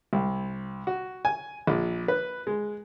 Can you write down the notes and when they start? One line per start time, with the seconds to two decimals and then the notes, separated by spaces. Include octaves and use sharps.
0.13 C2
0.87 F#4
1.25 G#5
1.67 A#1
2.08 B4
2.47 G#3